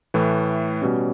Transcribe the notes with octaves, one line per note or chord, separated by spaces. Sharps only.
A2 E3 A3
B2 G3 C#4